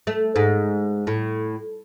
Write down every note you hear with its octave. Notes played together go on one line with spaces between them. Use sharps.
A3
G#2
A2